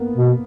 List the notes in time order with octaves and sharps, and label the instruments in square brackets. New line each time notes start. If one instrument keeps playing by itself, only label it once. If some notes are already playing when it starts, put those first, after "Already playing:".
Already playing: [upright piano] A#3 B3
[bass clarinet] B2